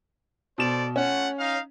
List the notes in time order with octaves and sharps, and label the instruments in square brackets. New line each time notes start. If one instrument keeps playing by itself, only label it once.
[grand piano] B2 E7 [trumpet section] A4 C5 D5
[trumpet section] A3 F4 F#5 [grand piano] C#4
[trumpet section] D#4 F5